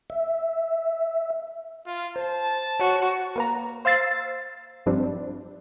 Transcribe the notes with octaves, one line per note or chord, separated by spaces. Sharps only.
E5
F4
C5 A5
F#4 C#5
A#3 B4 A#5
C5 F5 E6 A6 C7
G2 F3 G3 C4 D4